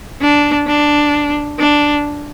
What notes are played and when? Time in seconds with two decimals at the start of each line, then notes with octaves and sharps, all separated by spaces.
0.21 D4
0.67 D4
1.59 D4